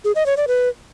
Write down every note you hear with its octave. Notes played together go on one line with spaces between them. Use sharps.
G#4
D#5
C#5
D5
B4